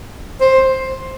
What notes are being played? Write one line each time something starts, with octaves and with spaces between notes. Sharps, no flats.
C5